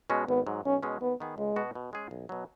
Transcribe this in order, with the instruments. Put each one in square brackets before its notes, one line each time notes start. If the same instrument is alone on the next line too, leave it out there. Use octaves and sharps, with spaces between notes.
[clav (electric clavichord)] B2 G#3 C#4 F#4
[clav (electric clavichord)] G#1 [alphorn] B3
[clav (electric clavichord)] G#2 F#3
[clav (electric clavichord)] B1 [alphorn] C#4
[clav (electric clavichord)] B2 G#3 C#4
[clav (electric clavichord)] D#2 [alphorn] B3
[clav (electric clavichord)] D#3 B3 G#4
[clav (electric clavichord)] C#2 [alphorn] G#3
[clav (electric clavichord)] B2 B3 F#4
B2
G#3 C#4 G#4
B1
B2 F#3